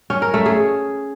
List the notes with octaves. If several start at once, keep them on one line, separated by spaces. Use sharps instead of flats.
C#4
A#4
A3
G#4